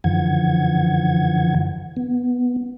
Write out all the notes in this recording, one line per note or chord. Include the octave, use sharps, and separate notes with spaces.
F#2 D3 E3 F3 F#5 G#6
B3